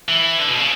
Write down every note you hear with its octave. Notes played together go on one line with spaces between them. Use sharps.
E3
D3
B2
C#3